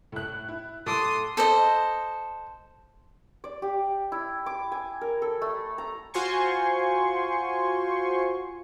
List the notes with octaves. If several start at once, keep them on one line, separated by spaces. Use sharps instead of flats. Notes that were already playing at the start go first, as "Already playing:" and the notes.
A2 F#6
E4
A2 A4 C6 D6 D#6 D7
A4 C5 D#5
D5
G4
E4
D6
G#5
A#4
A4
A3
A#5
F4 F#4 C5 G#5 C6 C#6